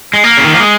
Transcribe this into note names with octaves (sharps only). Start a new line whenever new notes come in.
G#3
A#3
C#3
D#3
F3
G#3